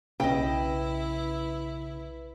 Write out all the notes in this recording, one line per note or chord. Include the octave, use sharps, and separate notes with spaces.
B1 C#3 E4 B4 D#5 G5